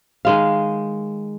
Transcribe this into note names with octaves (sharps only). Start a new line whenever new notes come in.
D#3 G#3 F5